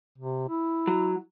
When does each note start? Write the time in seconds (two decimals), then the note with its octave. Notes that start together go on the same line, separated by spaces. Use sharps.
0.18 C3
0.48 E4
0.87 F#3